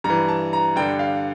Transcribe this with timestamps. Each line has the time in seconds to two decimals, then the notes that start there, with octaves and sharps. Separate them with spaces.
0.04 G2 A#5
0.10 E3
0.29 A5
0.53 A#5
0.76 G2 D3 G5
0.99 F5